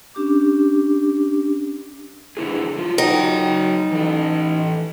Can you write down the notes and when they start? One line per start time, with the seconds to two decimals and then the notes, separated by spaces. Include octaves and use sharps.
0.15 C#4 D4 G4 D6
2.37 D3 E4 G#4
2.78 F#3 F4
2.98 F#3 D#4 F#5 G5
3.92 E3 A4